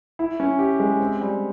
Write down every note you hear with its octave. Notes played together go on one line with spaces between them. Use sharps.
E4
C#4
G4
G#3
C4
G3